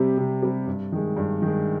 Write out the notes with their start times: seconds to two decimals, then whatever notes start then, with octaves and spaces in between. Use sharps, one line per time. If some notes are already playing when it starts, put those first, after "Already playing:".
Already playing: C3 G3 C4 G4
0.17 C3
0.42 G3 C4 G4
0.66 G2
0.92 D#3 G#3
1.16 G2
1.42 D#3 G#3